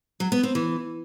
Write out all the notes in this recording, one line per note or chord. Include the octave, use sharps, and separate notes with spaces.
F#3
B3
C4
E3